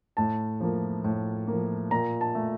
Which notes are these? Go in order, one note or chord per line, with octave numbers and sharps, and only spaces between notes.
A2 A5
F3 A#3
A2
A#3
F3
A#2 A#5
A5
A3